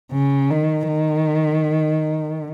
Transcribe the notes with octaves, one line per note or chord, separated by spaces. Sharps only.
C#3
D#3
D#3